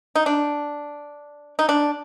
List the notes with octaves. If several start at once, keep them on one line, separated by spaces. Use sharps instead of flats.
D#4
D4
D#4
D4